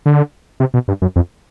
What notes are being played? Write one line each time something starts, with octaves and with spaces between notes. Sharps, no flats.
D3
C3
B2
G2
F#2
F2